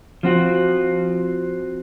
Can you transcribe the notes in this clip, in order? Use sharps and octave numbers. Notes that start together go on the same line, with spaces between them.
F3 C4 F#4